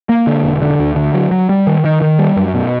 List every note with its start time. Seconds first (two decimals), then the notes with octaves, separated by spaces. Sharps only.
0.09 A#3
0.27 D3
0.44 E1
0.62 D3
0.79 D2
0.96 D3
1.14 F#3
1.31 F#3
1.49 G3
1.67 D#3
1.85 D#3
2.02 D#3
2.19 G3
2.37 F#2
2.54 B2